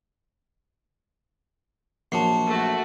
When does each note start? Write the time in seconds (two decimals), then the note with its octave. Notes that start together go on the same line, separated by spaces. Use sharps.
2.12 A#1 F#3 A5 C7
2.47 A3 F#4